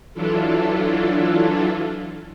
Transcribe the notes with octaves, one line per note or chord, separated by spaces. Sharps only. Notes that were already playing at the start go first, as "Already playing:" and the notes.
E3 F#3 D4 E4 F4 A4